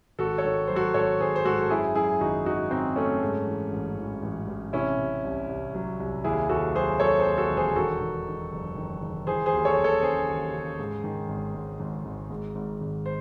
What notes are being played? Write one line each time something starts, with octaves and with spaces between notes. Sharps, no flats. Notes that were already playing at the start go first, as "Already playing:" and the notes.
G#1 F#4 A4
A4 C#5
D#3
F#3 C5
F#4 A4
G#1 A4 C#5
G#1 G#4 C5
C5
G#2 F#4 A4
A4
F#2 E4 G#4
F#2 E4 G#4
G#1 D#4 F#4
G#1 D#4 F#4
C#3 C4 D#4
F#2 A3 C#4
G#2
E3
A1
E3
A1
A1
C3 C#4 E4
C3
C2
C2
F#3
C2
D#2 E4 G#4
D#2 F#4 A4
F#3 G#4 C5
F#3 A4 C#5
G#4 C5
D#2
F#4 A4
E1
G#4 C5
D#3 F#4 A4
D#3
D#3
F#1
D#3
D#3
E3 G#4 C5
G#4 C5
D#2
A4 C#5
D#2
A4 C#5
C#3 G#4 C5
D#2
C#3
G#2
D#3
G#1
G#2
G#1
G#1
G#2
G#1
G#1
C5